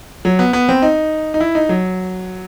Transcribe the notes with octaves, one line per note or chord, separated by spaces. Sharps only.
F#3
B3
B3
C4
D#4
D#4
E4
D#4
F#3